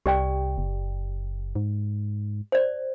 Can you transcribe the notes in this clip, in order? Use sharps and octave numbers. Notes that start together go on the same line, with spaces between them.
C2 G4 D5 G5
F#1
G#2
C5 D5